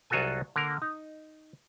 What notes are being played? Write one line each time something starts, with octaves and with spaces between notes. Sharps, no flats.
C2 F#3 F4 F#4 A4 G#5
D3 A#3 A#4
D#4